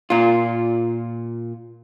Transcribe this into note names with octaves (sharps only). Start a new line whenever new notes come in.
A#2 F4